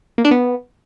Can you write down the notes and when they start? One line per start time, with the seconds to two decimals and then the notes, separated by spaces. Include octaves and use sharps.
0.18 A#3
0.25 D4
0.31 B3